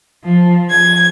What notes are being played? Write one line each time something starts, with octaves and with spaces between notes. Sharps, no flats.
F3
G#6